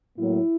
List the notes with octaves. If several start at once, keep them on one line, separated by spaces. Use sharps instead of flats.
A2 F#3 A#3 E4